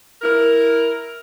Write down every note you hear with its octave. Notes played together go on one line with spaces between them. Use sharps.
E4 A#4